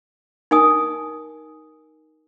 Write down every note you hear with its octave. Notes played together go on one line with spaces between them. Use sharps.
D#4 A#4 G#5 D#6